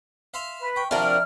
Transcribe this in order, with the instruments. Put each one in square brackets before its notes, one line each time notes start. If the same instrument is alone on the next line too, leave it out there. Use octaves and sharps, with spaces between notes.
[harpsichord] E5 F5 C6
[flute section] B4
[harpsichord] G5 [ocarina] C#6
[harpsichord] C3 F3 F#4 [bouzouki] D4 A#4 [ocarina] E5 [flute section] F6